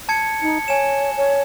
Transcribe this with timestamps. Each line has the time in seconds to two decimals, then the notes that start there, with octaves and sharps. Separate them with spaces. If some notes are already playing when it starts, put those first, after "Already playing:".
0.09 A5 G#6 C#7
0.42 D#4 C#7
0.68 C#5 G#5 E7
1.17 C#5